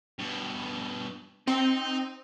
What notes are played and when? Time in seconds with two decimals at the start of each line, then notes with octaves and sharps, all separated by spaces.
0.19 G2 B2
1.48 C4 D#4